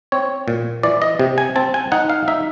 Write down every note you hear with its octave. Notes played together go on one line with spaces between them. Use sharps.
C4 C#5
A#2
E3 D5
D#5
C3
G#5
C4 A5
G#5
D#4 F#5
F5
D#4 E5